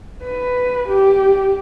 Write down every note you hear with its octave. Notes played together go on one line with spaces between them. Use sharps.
B4
G4